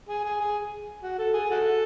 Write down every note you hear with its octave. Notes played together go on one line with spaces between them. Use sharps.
G#4
G#4
G#4
F#4
A4
G#4
F#4 A4